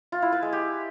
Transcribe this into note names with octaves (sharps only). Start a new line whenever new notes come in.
F4
E4
B4
G#3
G4